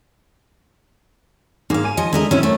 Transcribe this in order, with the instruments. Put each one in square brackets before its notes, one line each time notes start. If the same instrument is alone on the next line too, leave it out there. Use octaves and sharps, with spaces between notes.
[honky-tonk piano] G#2 G#4 [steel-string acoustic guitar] A#3 F5
[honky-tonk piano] G#5 D#7
[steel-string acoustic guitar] F3 D#5
[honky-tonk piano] D3 G#3 D4 [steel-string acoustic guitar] E4 A#4 D#5
[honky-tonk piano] F#2 C4 [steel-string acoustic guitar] C#4 E4
[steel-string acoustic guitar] A3